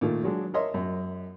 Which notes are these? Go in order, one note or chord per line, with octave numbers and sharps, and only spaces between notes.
A#2 D#3 A3
F#3 G#3 D4
A#4 C#5 D#5 E5 C6
F#2